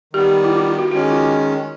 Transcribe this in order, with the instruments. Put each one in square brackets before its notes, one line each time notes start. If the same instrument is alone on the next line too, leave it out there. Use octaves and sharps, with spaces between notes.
[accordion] D#3 G3 B3 [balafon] G4
[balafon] E4
F4
E4
F#4
[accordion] D#3 G#3 C#4 [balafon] F#4
[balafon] F4